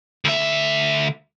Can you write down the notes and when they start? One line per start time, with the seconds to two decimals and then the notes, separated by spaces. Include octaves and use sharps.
0.25 D2 E5